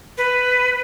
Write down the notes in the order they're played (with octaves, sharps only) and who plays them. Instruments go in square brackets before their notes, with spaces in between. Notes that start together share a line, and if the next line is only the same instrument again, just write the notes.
[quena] B4